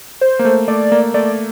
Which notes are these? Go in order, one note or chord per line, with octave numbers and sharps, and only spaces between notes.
C5
A#3
A3
A3 D5
A#3
A3 D5